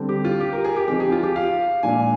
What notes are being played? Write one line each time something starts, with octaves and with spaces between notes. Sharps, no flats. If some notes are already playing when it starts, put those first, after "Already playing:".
Already playing: D3 G3 C4
G4
F4
G4
A#4
G#4
G4
F3 C4 D#4 G4
G#4
F4
G4
F5
A#2 F3 G#3 D4 G#5